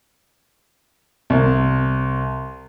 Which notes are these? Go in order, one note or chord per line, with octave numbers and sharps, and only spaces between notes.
C2